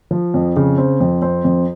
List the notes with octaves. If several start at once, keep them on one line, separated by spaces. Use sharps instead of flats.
F3
F2
C#3
C4
F2
C4
F2